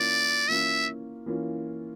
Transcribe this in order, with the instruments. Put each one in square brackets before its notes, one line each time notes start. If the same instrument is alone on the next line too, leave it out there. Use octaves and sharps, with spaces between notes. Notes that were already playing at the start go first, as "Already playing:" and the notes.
Already playing: [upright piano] E3 A#3 C#4 F4 [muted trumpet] D5
[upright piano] E3 A#3 C#4 F4 [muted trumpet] E5
[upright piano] E3 A#3 C#4 F4